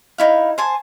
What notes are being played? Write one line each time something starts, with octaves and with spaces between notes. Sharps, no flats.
D#4 E4 F5
C5 G#5 A5